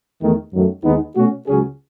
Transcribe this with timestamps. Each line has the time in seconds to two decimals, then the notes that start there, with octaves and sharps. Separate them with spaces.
0.21 E2 D#3 A3
0.53 F#2 D#3 F#3 A3
0.84 D#2 D#3 G#3 B3 D#4
1.16 B2 A3 C#4 F#4
1.47 C#2 C#3 F#3 C#4 G#4